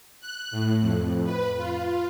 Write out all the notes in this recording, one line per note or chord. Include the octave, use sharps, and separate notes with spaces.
F#6
A2
F2
B4
F4